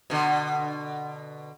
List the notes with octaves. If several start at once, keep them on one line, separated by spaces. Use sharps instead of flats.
B2 D3